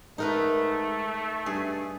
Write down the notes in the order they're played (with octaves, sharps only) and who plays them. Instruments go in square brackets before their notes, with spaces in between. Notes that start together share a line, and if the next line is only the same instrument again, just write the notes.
[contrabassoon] G#2 [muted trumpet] A3 [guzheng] D#4 A#4 B4
[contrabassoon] G2 [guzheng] G#4